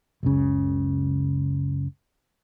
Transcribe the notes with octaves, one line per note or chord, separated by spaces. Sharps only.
F#1 C#2 C#3